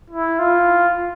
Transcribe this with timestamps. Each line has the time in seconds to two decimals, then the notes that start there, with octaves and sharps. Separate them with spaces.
0.10 E4
0.39 F4